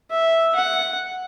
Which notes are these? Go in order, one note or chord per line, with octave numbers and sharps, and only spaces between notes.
E5
F#5